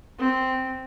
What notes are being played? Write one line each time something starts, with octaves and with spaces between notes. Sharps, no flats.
C4